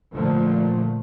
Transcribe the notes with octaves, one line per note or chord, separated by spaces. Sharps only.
A#2 D3 F3 A3